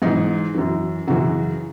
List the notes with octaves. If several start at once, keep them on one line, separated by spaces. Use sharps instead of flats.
G#2 E3 D#4
F#2 E3
F#2 C#3 E3 F#4